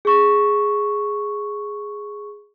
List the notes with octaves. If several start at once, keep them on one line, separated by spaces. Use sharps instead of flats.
G#4 C#6